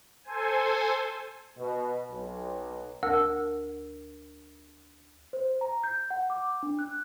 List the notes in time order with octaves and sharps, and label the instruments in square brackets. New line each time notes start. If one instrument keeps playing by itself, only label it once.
[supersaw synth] A4 C5 G#5
[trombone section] B2
B1
[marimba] D2 A#4 E6
[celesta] C5
A#5
G6
F#5
D6
D4
F#6